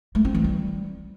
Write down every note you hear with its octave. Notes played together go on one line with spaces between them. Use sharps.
A3
C4
E3
G3